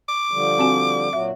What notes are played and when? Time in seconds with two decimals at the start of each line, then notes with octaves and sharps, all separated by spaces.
0.09 D6
0.32 D3 F3 G3
0.59 C4 F#4 G#5
1.13 A#2 F#3 F#4 E5